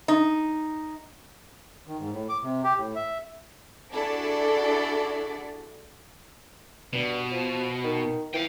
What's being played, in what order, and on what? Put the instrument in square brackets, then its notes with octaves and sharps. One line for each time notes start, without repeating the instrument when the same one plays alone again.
[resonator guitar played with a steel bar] D#4
[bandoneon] D#3
G#2
A2
D6
C3
G4
A2
E5
[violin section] D4 E4 F#4 G#4 A4 D5
[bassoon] G2 [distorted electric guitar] B2
[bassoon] F3
D#3
[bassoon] E3 [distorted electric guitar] F5 G5